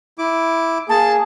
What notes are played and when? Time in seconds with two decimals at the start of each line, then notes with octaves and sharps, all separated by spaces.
0.18 E4 D6
0.89 A#3 G#4 A5